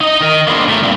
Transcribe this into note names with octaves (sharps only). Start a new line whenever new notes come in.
D#4 D#5
D#3 A#4 D#5
A#3 B3 D4 G#4 A4 C5
A2 A3 A#4
G2 A#2 C4